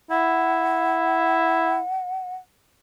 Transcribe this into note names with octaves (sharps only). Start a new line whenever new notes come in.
E4 F#5